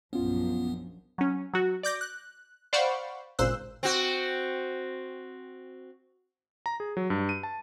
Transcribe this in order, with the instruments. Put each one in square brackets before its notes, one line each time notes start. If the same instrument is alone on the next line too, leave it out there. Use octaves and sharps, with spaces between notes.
[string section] A#1 F#2 F3 [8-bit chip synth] B3 [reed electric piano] C#4 F4
[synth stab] F#3 C#4
F#3 F#4
D5 D6 G6 A#6
F#6
C5 D5 F5 F#5 B5 C#6
G#1 C#2 A#2 C5 E6 F#6
[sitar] C4 F#4
[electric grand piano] A#5
G#4
F#3
G2
D#7
A5